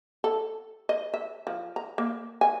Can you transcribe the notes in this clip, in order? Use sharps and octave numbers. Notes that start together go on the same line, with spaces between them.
A4
D#5
E5
F3
A#5
A#3
G#5